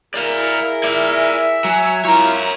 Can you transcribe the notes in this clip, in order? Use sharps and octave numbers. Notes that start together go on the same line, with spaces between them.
E4 G#4 A#4 D5 F5
D5 E5 G#5
F#3 C#5 G#5
F#3 E4 F4 A#4 C#5 A#5